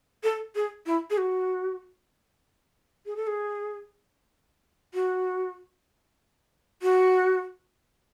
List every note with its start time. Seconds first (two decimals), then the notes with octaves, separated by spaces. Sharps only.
0.24 A4
0.55 G#4
0.86 E4
1.10 G#4
1.18 F#4
3.06 G#4
3.16 A4
3.27 G#4
4.94 F#4
6.82 F#4